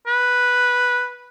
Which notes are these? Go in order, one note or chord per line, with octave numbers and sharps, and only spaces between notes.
B4